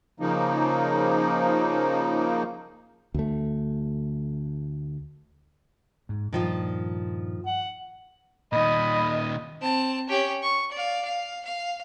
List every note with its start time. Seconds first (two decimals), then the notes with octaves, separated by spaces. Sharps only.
0.20 C#3 F3 A#3 D#4
3.14 D2 A3
6.09 G#2
6.33 G2 A#2 D#3 F3 F4
7.46 F#5
8.53 A#2 D#3 D#5 B5
9.61 C4 A5
10.09 C#4 G4
10.42 C#6
10.72 D5 F5
11.05 F5
11.45 F5